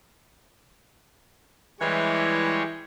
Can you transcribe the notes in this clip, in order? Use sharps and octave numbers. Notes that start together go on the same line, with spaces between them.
E3 G3 G#3 C#5